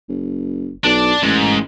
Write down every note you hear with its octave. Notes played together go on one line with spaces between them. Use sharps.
F#1
B1 D4 D5
A1 G#2